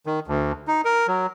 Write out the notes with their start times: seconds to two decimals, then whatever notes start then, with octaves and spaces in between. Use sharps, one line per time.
0.06 D#3
0.27 D2
0.68 D#4
0.85 A#4
1.08 F#3